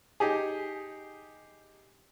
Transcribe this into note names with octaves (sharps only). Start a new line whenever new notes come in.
D#4 G4 G#4